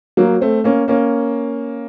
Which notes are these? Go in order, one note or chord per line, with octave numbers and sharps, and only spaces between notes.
F#3 A#3
A3 C4
A#3 C#4
A#3 C#4